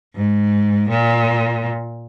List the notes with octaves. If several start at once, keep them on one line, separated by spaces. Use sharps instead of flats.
G#2
A#2